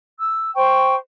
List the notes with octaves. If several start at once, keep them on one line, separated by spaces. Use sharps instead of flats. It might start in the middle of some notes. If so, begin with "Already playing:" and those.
E6
C5 G5 C#6